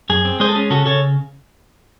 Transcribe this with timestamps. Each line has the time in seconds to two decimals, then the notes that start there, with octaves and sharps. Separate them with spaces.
0.10 F#2 G#4
0.25 C4
0.40 G#3 G#4 C5
0.49 A4
0.55 C#4 G#4
0.70 C#3 F#4 A4
0.86 C#3 A4 C#5